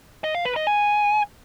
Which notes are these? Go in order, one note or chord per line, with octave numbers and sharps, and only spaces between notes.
D#5
F5
B4
D#5
G#5